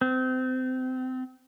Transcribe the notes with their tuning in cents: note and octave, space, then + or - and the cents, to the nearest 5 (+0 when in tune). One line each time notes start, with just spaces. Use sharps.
C4 -30